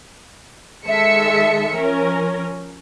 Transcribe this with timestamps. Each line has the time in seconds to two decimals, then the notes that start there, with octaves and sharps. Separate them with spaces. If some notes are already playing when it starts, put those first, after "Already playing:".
0.86 D#3 G#3 A4 E5 C#7
1.73 F3 C#4 A#4